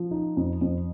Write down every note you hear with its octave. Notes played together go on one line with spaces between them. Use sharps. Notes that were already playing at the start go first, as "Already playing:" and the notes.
Already playing: F3
D#4
F2
F2